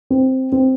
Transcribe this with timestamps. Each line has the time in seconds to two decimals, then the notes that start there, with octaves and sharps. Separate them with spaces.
0.10 C4
0.52 C4